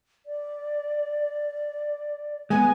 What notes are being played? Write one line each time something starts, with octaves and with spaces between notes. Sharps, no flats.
D5
G#3 B3 G#5